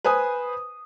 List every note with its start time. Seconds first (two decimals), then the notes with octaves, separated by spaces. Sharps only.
0.04 B4 C5 G#5 D#6